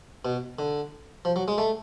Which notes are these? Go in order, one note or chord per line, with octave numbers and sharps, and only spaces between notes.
B2
D3
F3
F#3
G#3
A3